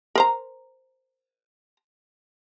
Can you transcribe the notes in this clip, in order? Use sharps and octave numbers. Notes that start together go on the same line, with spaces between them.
A#4 C5 A#5